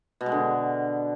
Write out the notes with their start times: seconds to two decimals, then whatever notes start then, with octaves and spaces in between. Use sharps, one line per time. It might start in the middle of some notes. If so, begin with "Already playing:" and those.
0.21 B2
0.26 G#3
0.32 D3